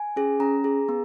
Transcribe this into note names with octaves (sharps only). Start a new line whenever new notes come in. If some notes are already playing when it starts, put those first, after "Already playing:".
Already playing: G#5
C#4 G#4
C#4 A#5
G#4
B3